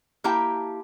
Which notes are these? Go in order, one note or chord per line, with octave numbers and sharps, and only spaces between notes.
A#3 E4 G4 G5 A5 A#5